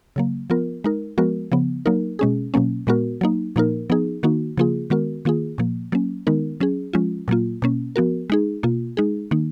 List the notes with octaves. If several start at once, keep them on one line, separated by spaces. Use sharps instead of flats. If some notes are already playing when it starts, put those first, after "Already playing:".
C#3 F#3 A#3
F3 B3 F4 A#4
G#3 D#4 A#4
F3 G#3 B3 F#4 A#4
C#3 F3 B3
F#3 A#3 D#4 A#4
B2 G#3 C#4 G#4
B2 F#3 A#3 C#4
A#2 G#3 B3 F#4 A#4
F#3 A#3 D#4
A#2 F3 A#3 D#4 A#4
F3 B3 D#4 G#4
D#3 A#3 D#4 F#4
C#3 F3 A#3 F4 G#4
D#3 G#3 B3 F#4 A#4
D#3 A#3 F4 G#4
A#2 F3 A#3
F#3 A#3 C#4
D#3 G#3 B3 D#4 A#4
F#3 C#4 G#4
F3 G#3 C#4 F4
A#2 F#3 A#3 F4
B2 A#3 C#4
F3 B3 F#4 A#4
G#3 D#4 G#4
B2 A#3 F4
G#3 D#4 G#4
D#3 A#3 D#4